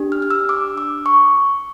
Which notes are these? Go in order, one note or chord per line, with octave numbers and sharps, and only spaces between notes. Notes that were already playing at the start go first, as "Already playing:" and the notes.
Already playing: D4 G4
F6
F6
E6
D6
D6
C#6